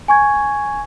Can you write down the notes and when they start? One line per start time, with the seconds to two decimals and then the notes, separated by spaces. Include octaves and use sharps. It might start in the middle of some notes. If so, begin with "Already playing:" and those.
0.08 G#5 C#6 G#6